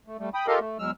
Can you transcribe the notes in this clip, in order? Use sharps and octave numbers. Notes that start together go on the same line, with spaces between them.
A3
G3 A3
G5 B5 D#6
F4 G4 A4 A#4 D#5 F5
A3
E2 F#3 G#3 E6 F6